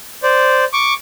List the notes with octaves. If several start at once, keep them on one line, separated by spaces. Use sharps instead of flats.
C5 D5
C#6 D6